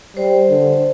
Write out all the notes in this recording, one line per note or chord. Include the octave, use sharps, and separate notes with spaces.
G3 C5
D3